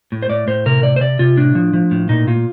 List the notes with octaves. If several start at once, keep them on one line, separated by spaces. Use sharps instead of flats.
A2
C5
A2 D5
A2 C5
C3 A#4
C3 D5
C5
C3 D5
C3 F4
A2 D4
F3
F3
A2
A#2 D#4
A#2 F4